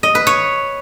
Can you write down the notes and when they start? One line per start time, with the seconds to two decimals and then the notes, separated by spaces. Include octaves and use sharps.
0.03 D#5
0.15 B4
0.27 C#5